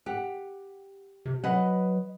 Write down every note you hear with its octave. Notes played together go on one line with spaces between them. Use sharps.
G4 F#5
C3
F#3 B4 D#5 F#5